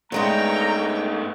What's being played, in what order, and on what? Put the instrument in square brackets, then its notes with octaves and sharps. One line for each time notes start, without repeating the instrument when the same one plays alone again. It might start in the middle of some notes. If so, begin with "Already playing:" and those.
[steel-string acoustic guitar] G2 G#3 D#4 [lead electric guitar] A3 B3 [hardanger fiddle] C#5 G5 [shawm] A#5